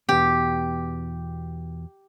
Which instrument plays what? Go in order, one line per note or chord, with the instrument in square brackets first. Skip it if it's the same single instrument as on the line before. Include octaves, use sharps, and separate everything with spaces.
[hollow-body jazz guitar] E2 B2 [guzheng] G4